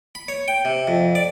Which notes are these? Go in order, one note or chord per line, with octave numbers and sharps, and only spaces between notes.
B5
C#5
G5
C3
F2
D5